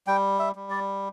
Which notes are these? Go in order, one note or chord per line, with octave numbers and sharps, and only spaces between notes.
G3 G5
E5
G3
D5